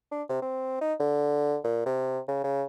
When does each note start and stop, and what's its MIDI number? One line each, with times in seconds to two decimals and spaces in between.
0.11 0.23 62
0.29 0.40 48
0.42 0.78 60
0.81 0.94 63
1.00 1.57 50
1.64 1.84 46
1.86 2.19 48
2.28 2.40 49
2.44 2.65 49